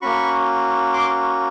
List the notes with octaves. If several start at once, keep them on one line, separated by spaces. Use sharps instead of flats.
A#3 C#4 F#4 B5 C#6
C6 D6